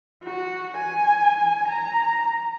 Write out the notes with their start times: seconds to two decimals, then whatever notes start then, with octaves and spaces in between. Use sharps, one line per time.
0.24 F#4
0.77 G#5
1.68 A#5